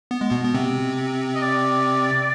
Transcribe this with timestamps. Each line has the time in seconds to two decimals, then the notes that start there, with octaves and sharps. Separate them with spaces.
0.11 B3
0.21 G#3
0.31 B2 B3
0.44 B3
0.55 C3 C4
1.35 D#5
1.42 D5